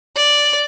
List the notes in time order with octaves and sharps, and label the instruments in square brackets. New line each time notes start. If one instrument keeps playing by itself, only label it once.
[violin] D5